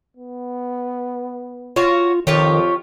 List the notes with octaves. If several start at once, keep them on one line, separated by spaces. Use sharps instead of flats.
B3
F4 F#4 C#5
F2 D#3 F4 G4 C#5